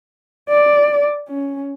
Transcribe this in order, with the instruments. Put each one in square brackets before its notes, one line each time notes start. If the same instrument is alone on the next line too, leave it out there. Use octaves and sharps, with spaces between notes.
[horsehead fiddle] D5
C#4